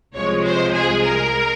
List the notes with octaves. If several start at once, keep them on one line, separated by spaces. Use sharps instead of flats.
C2 C3 F3 G#3 C#5
C5
G#4
A#4